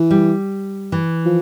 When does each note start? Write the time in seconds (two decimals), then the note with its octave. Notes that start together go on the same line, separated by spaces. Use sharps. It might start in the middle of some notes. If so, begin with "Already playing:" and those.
Already playing: E3
0.10 G3
0.92 E3
1.25 F3